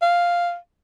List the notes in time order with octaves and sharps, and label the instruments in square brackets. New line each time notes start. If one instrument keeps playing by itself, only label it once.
[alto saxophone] F5